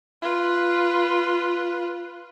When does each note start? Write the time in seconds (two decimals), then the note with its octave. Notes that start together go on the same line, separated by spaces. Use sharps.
0.22 F4 B4